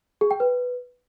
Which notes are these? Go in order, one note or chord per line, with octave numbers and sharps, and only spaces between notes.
G#4
G5
B4